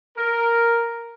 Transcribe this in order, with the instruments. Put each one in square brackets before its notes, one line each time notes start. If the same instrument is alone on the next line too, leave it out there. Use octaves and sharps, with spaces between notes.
[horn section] A#4